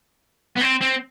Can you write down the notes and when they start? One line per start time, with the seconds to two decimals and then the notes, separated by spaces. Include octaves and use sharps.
0.57 B3
0.62 C4
0.81 C4